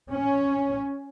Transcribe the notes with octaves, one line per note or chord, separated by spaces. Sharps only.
C#4